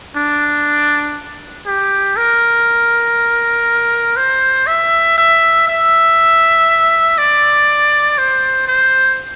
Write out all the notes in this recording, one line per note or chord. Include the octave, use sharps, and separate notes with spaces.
D4
G4
A#4
C5
E5
E5
E5
D5
C5
C5